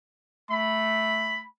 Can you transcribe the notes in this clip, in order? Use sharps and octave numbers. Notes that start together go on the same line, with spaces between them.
A3 B5